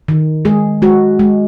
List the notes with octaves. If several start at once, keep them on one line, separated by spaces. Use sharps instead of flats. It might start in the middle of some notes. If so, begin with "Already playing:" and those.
D#3
G#3 G#4
G#3 F#4
G#3